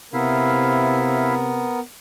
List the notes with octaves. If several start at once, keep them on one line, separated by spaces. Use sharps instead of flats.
C3 B3 E4 A#4 E5 F5